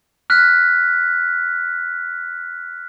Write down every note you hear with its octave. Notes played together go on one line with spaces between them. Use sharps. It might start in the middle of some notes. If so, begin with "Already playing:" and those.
F6 F#6 B6